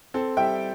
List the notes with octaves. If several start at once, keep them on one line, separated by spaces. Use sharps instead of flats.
C4 A4
G3 E5 G5